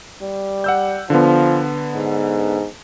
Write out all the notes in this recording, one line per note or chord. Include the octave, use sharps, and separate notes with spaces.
G3
F#5 E6 G6
D3 F3 B3
G#2